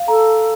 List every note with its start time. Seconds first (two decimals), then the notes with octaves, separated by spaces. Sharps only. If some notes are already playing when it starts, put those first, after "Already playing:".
Already playing: F5
0.08 A4 A#5